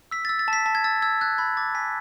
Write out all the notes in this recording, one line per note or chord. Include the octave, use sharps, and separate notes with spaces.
E6 B6
A6
E6
A6
A5 B6
A5
G#6
E6 A6
E6 G#6
F#6 G#6
B5 G#6
D6 A6
G#5 B6